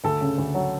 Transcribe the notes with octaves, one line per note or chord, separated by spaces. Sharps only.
D2 A4
C#3
D2
F#3